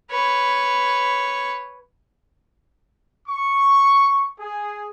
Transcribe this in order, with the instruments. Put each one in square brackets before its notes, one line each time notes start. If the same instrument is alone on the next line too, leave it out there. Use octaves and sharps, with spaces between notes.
[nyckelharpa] B4 C#5
[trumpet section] C#6
G#4